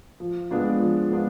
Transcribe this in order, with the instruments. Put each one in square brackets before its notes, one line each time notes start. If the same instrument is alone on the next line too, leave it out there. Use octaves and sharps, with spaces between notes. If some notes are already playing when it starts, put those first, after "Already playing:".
[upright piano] F3
G#3 B3 D4 F4
F3
G#3 B3 D4 F4